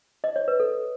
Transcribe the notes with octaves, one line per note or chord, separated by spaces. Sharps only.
D#5
C#5
B4
A4